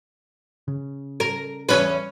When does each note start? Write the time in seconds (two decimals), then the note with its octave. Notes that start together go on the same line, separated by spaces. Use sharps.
0.68 C#3
1.20 A#4
1.69 E2 C#4 B4